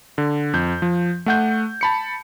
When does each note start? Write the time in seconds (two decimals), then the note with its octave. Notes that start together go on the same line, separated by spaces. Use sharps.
0.18 D3
0.53 F2 G6
0.82 F3
1.26 A3 F#5 G6
1.81 A5 B5 C#7